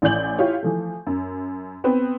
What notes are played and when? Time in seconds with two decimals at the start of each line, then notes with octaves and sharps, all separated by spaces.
0.02 A1 E3 D5 G6 F#7
0.39 E4 F4 G4 C#5
0.63 E3 F3 A3
1.07 F#2
1.84 B3 C4 B4